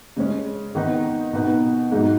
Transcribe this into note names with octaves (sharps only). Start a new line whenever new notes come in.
C#3 G#3 C#4
D#3 B3 D#4
B2 B3 D#4
G#2 F#3 D#4